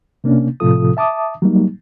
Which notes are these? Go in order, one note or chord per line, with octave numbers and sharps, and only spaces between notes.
C3 A#3 C#4 D4
A2 C3 F3 F4 A4 D#6
E5 A5 D6 D#6
F#3 G3 A#3 D#4